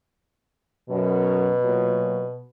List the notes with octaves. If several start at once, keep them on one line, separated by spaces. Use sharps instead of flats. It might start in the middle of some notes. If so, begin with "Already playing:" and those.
F#2 B2 F#3
A#2 F#3